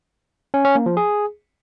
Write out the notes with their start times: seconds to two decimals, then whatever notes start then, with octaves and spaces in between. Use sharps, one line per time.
0.54 C#4
0.65 C#4
0.75 A#3
0.86 F3
0.97 G#4